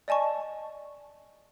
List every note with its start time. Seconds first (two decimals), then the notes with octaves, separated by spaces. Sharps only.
0.08 D5 D#5 G#5 A5 C#6